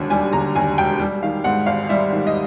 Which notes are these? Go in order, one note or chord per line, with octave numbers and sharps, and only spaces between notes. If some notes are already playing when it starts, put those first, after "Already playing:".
Already playing: E1 D#2 D3 G3
G3 G#5
D3 A#5
D#2 G#5
E1 G5
G3
D#3 F5
G#2 F#5
G#1 F5
G3 E5
D#3
D#5